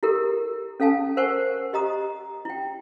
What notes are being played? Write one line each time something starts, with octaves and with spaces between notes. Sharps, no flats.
E4 G4 A4 A#4
C#4 A4 F5 G#5 A5
A#4 C5 F#5 G#5 C#6
G4 D#5 A#5 D#6
E4 G5